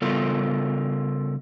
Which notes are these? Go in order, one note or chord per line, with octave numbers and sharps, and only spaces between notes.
C#3 G3 B3 F4 A4 A#4